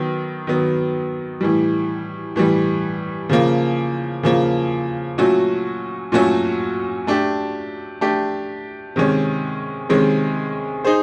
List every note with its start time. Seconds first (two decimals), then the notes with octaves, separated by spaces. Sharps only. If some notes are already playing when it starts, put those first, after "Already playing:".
Already playing: D#3 F#3 B3
0.47 D#3 F#3 B3
1.41 A2 E3 G3
2.36 A2 E3 G3
3.29 C#3 F3 A#3
4.23 C#3 F3 A#3
5.18 A#2 F#3 A3 C#4 F#4
6.12 A#2 F#3 A3 C#4 F#4
7.07 A3 D4 G4
8.01 A3 D4 G4
8.96 C3 D#3 G#3 C#4
9.89 C3 D#3 G#3 C#4
10.85 D#4 G#4 C5